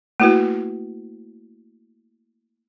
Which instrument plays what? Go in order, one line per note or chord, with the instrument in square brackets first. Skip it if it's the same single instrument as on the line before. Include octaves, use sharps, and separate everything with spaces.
[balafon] A3 A#3 E4 F#4 B4